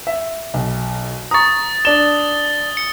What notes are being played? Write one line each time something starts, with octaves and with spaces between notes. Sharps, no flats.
E5
B1
A#5 C#6 D#6 A6
D4 E7 G7
C#7